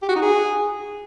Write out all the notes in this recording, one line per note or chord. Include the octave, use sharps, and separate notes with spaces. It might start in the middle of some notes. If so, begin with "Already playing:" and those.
G4
F#4
D#4
G#4